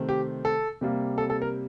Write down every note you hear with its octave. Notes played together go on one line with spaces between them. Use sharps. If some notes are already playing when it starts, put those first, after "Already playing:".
Already playing: C3 D#3 A3 C4
G4
A4
C3 G3 A#3
A4
A4
A#4